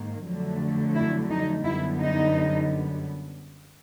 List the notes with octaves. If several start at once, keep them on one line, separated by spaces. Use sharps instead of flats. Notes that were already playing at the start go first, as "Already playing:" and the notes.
Already playing: G#2 D#3 A#3
F2 D3 F#3 A3
E4
D#4
F#2 D3 G3 B3 E4
D#4